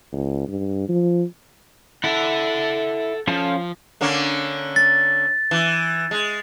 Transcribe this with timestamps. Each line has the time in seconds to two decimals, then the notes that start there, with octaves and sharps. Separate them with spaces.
0.13 C#2
0.48 G2
0.89 F3
2.04 E4 A4 F#5
3.28 F3 C#4 F4 A4
4.01 D3 A#3 C#4
4.76 A6
5.51 E3
6.11 G#3